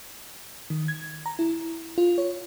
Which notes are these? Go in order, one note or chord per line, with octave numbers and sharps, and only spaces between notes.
D#3
G#6
A#5
E4
F4
C#5